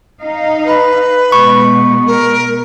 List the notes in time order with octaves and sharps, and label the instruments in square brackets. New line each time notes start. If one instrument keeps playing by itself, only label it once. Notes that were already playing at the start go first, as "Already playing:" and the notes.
[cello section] D#4 F5
[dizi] B4
[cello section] B2 G#3 B3 [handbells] C#6
[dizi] A#4